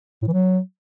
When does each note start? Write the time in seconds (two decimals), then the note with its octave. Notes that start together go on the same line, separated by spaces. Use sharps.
0.22 A2
0.28 E3
0.33 F#3